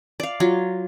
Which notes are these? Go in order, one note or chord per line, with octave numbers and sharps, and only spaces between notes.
D5 F5
F#3 F4